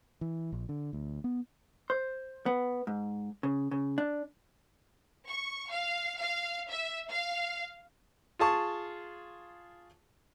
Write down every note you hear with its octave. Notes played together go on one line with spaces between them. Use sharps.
E3
A#1
D3
D2
B3
C5
B3
G#2
C#3
C#3
D4
C#6
F5
F5
E5
F5
F4 G#4 A5 C#6